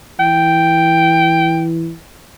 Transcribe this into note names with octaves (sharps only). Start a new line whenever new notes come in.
E3 G5